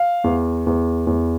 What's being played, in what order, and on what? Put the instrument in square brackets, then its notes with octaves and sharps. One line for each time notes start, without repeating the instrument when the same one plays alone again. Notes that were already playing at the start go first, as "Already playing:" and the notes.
Already playing: [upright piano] F5
E2
E2
E2